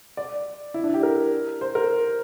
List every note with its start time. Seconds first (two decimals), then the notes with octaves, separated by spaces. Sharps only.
0.17 D5
0.74 E4
0.84 D4
0.94 G4
1.03 A#4
1.61 C5
1.75 A#4